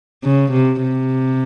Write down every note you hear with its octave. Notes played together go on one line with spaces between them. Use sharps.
C#3
C3
C3